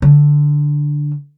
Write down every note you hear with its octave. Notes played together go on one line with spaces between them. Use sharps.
D3